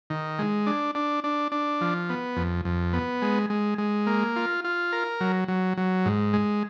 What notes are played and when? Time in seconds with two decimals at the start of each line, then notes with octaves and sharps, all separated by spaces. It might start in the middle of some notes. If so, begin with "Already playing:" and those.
0.10 D#3
0.39 G#3
0.66 D4
0.95 D4
1.24 D4
1.52 D4
1.81 F3
2.09 B3
2.37 F2
2.65 F2
2.93 B3
3.22 G#3
3.50 G#3
3.78 G#3
4.07 A#3
4.36 F4
4.64 F4
4.93 A#4
5.21 F#3
5.48 F#3
5.77 F#3
6.06 G#2
6.33 G#3